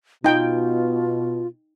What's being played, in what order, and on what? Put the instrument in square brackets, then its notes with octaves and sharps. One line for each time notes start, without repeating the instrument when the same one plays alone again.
[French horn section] B2 [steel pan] D#4 G5 [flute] F4